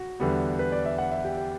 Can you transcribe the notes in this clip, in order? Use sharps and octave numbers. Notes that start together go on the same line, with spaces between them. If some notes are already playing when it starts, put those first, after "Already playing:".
Already playing: F#4
E2 D3 G3 B3
B4
D5
E5
F#5
E5
G4
G4